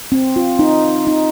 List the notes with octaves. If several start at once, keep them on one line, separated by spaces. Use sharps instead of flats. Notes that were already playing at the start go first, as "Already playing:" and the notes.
C4
F4
D#4
D#4